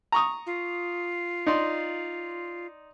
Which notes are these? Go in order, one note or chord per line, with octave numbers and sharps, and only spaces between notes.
A#5 C#6 D#6
F4
D#4 D5 C6